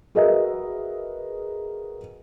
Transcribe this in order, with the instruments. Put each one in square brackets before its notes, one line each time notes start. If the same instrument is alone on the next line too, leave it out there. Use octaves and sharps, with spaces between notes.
[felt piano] F#4 G#4 A#4 B4 D#5 E5